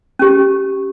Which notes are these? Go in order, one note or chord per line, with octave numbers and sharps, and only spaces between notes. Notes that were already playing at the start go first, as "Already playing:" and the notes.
C#4 G4